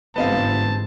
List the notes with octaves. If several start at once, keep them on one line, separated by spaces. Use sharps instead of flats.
G1 G#2 E3 B3 C4 D#5 F5 A5